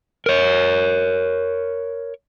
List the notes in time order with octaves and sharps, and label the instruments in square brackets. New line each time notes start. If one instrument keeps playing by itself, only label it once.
[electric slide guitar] A#4 C#5